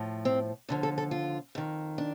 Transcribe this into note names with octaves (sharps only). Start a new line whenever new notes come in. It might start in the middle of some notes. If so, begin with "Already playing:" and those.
Already playing: A2 F3
C4
D#2 D3 F3 D4
A4
A4
F4
F2 D#3
D4